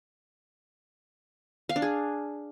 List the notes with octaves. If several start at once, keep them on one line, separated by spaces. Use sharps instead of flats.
F5
D4
G#4